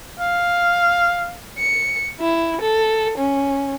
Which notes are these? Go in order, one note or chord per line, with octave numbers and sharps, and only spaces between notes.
F5
C#7
E4
A4
C#4